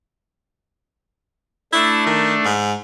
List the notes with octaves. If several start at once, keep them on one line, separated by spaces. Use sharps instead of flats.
A3 D4 E4
D#3
G#2